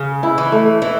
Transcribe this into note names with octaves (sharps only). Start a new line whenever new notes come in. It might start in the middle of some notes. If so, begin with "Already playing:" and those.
Already playing: C#3
E4
E3
A3
E3 E4